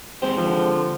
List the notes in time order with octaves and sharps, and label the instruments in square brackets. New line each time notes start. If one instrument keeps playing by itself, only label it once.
[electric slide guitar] G#3 C4 G4 [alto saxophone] C5
[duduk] D3 [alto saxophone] F3